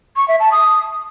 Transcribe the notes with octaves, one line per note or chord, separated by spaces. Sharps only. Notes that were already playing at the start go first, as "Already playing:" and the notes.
C#6
E5
A5
D#6